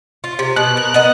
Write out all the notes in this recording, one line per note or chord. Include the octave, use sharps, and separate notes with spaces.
F4
C3
B2 F#6
A#4
B3 D#5 F#5